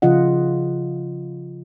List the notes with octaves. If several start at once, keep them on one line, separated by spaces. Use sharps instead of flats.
C#3 F3 F4 D#5 F#5